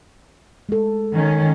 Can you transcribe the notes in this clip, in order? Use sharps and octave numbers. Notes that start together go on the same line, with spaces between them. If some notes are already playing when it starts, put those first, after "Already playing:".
G#3 A4
D#3 C#4